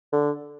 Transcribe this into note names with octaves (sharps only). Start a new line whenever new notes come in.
D3